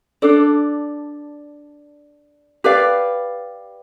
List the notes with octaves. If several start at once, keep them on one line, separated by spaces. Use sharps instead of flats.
D4 A4 D5
G4 B4 D5 F5